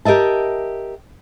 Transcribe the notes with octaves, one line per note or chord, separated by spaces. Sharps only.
G4 A#4 D#5 E5 A5